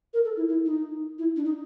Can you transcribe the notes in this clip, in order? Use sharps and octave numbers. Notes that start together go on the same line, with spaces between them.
A#4
A4
E4
E4
D#4
E4
D4
D#4